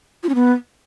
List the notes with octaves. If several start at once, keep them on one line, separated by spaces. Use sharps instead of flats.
F4
C#4
B3